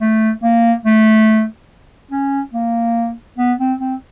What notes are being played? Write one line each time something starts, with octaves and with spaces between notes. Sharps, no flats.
A3
A#3
A3
C#4
A#3
B3
C4
C4